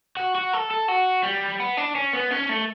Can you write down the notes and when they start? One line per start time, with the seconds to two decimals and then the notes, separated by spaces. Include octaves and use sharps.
0.17 F#4
0.35 F#4
0.53 A4
0.70 A4
0.88 F#4
1.24 G3
1.60 B3
1.77 D4
1.95 C#4
2.13 B3
2.31 C#4
2.49 A3